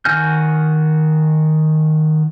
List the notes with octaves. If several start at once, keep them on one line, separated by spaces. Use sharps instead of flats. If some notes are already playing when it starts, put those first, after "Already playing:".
D#3 F#4 G#5 F6 G6